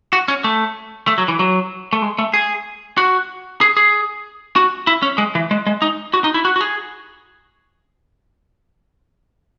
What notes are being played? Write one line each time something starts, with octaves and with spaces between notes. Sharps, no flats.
F#4
C#4
A3
A3
F#3
E3
F#3
A3
G#3
A3
G#4
F#4
G#4
G#4
F#4
E4
C#4
G#3
E3
G#3
G#3
D#4
F#4
D#4
E4
F#4
F#4
G#4